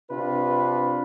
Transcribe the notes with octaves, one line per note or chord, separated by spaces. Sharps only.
C3 D4 F4 B4